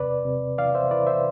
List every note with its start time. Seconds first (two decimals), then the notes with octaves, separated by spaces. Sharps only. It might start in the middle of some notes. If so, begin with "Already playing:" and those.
Already playing: E2 C3 B4 D5
0.25 C3
0.58 E3 D5 F5
0.75 C5 E5
0.91 E3 B4 D5
1.07 C5 E5